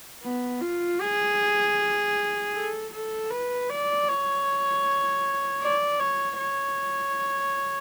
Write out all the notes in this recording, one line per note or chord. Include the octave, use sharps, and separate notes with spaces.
B3
F4
G#4
A4
A4
B4
D5
C#5
D5
C#5
C#5